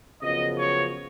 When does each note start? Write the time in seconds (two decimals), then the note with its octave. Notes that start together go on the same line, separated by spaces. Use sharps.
0.22 F#2 C#3 F3 B3 D#5
0.58 C#5